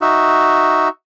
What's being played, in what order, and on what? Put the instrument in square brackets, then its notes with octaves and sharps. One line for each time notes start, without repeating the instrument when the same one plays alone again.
[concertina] D#4 F#4 E5